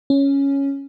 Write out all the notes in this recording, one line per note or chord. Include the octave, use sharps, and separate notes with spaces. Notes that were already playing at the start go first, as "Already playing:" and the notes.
C#4